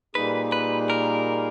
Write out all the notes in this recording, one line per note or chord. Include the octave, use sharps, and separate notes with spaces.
A#2 G3 A#3 D#4 G#4 B4
B4
A#4